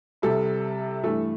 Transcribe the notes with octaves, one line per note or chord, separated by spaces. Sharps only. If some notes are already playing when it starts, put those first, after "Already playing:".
C2 C3 G3 A4
G2 E3 A3 A4